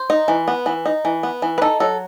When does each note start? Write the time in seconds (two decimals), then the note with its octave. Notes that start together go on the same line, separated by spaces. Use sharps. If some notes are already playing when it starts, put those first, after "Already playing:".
Already playing: C5
0.10 D#4
0.28 E3
0.48 B3
0.66 E3
0.86 D#4
1.05 E3
1.23 B3
1.42 E3
1.58 B4
1.62 D#4 A4
1.80 F#3 A4